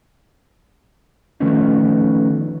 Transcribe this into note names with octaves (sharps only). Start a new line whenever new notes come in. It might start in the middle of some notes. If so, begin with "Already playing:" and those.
D#3 F3 A3 B3 C#4 D#4